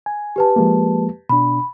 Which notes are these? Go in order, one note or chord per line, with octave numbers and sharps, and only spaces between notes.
G#5
G4 B4 A5
F3 G#3 A#3
B2 D4 B5